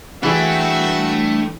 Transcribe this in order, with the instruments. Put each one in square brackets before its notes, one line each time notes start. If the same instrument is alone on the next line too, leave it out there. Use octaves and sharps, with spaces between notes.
[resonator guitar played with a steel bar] E3 G#4 [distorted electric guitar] A3 [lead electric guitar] D4 G5 [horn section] F#4 E5